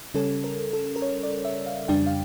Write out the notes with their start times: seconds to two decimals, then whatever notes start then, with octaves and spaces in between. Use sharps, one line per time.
0.14 C#3 G3 C#4 A4
0.44 A#4
0.73 A4
0.96 A#4
1.02 C#5
1.23 D5
1.45 E5
1.66 F5
1.88 F2 C#3 G3 D4 G5
2.06 F5